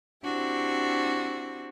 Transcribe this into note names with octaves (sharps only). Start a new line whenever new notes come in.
C4 D4 E4 F#4 G4